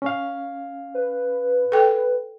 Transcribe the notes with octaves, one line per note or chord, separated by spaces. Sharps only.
C#4 F5
B4
A4 G5